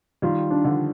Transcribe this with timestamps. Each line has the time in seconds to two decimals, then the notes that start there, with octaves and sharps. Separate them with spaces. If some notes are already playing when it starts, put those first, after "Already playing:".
0.22 D#3 G3 F4
0.50 D4
0.65 D3 F3